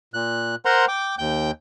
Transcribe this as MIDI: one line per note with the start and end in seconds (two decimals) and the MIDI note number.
0.14 0.55 46
0.14 0.55 90
0.65 0.85 70
0.65 0.85 72
0.65 0.85 78
0.65 0.85 82
0.65 0.85 84
0.88 1.15 79
0.88 1.15 86
1.19 1.51 39
1.19 1.51 79
1.19 1.51 91